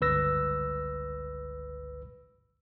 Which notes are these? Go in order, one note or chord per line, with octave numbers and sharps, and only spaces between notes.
G1 C#2 B4 E6 A#6